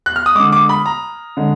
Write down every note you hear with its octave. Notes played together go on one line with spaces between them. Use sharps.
F#6
F6
D#6
D3 G#3 D6
D6
B5
A#5
D3 G#3